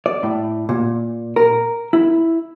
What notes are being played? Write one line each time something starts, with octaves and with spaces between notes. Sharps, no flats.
D5
A2
A#2
A#4
E4